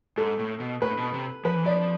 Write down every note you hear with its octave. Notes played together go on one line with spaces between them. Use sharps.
G#2 A4
A2
B2
A2 B4
B2
C3
F3 B4
E3
F3 D5